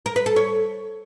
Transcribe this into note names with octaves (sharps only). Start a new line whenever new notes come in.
A#4
B4
A4
C#5